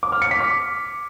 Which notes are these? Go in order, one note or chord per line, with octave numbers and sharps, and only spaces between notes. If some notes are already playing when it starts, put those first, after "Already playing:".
D6
F6
C#7
B6
D6